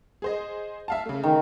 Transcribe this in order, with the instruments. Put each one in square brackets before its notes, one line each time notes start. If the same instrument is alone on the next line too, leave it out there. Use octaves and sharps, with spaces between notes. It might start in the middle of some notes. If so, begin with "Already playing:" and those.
[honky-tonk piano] G#4 C5 D#5
E5 F5 A5
C#3 A3
[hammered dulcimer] D#3